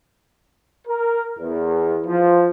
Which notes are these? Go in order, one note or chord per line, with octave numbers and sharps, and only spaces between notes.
A#4
E2
F3